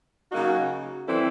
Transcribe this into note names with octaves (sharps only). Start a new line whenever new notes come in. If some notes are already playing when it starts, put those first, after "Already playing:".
C#3 F#3 A#3 D#4 F#4
E3 G3 C4 E4 A4